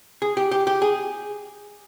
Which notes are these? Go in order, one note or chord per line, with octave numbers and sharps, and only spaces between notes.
G#4
G4
G4
G4
G#4